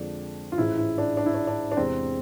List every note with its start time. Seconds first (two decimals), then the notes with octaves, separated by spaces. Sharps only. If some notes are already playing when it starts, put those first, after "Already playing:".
Already playing: F2 D3 G#3 D4
0.52 F4
0.58 A1 G#2 G#3 E4
0.77 E4
0.98 D4
1.17 D4
1.26 E4
1.35 D4
1.47 D4
1.72 D4
1.77 E2 C3 G#3 C4